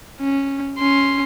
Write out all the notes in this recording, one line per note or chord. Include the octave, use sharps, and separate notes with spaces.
C#4
C#4 C6